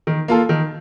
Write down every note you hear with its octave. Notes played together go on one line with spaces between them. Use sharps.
D#3
A#3 F4 A4
D#3